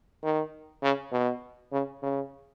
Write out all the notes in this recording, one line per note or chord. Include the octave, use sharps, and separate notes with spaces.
D#3
C#3
B2
C#3
C#3